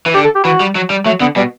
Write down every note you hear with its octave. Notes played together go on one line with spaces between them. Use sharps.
E3
D3 G4
A4
G4
E3 F#4
G3
F#3
G3
F#3 A3
D3 B3
B2 G3